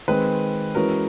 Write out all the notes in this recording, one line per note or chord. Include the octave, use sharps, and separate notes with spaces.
D#3 G#3 C4 B4
E3 G#3 C#4 F#4 A#4 B4